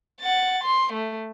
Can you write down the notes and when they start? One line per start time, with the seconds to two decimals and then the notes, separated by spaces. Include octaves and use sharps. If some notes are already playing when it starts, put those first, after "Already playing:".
0.21 F#5 A6
0.63 C6
0.93 A3